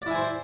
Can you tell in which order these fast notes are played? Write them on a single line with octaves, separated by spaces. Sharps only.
D5 E4 G#5 C5